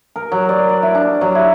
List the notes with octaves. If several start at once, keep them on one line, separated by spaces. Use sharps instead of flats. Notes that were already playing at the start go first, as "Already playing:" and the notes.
A#4
F#3
D5
D5
E4
D4
F#3
E4